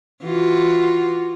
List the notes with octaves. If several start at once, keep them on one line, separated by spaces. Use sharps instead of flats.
E3 F4 F#4